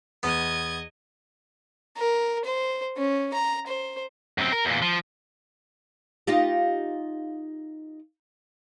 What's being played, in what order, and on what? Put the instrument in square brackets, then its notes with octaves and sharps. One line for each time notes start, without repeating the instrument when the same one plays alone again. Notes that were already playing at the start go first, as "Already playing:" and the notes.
[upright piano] E2 [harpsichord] B3 [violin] D#5 G#6
[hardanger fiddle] A#4
C5
C#4
A#5
C5
[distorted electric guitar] F#2 C4
A#4
E2 A#2
F3
[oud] D#4 F4 G4